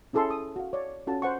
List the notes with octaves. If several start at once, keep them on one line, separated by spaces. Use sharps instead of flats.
C#4 E4 G#4 A4 A5 C6
D#6
F#4 F5
C#5 D5
C#4 F4 F#4 A4 A5
C5 F#5 C#6